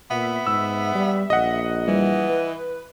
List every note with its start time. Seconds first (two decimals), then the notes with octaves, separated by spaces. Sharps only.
0.11 A#2 B3 E5
0.47 G#2 E6
0.95 G3
1.30 A#1 D#5 F#5
1.88 E3 G3
2.29 B4